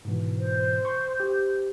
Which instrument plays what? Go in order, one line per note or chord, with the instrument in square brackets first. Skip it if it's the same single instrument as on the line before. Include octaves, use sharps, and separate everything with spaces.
[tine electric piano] G#2 B2 E3
[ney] C5
[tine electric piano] C6 C#6
G4